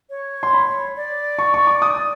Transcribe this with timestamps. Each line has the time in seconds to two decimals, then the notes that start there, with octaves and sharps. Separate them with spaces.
0.10 C#5
0.43 C6
0.53 B5
0.96 D5
1.39 C#6
1.54 C#6
1.67 D6
1.82 D#6